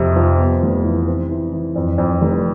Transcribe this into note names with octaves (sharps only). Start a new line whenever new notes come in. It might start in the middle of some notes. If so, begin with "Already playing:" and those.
Already playing: F2 C3
F3
B3
F1
E3
C4
E3
E3
F2
F2
F1